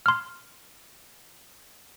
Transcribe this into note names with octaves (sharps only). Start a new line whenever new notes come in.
C6 F6